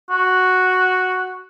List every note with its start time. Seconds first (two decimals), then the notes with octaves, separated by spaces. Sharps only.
0.10 F#4